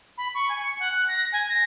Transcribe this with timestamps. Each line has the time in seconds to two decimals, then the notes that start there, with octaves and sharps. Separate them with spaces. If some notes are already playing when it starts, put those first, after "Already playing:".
0.18 B5
0.35 C#6
0.49 G#5
0.62 C#7
0.80 F#5
0.92 F#6
1.08 A#6
1.33 G#5
1.49 A#6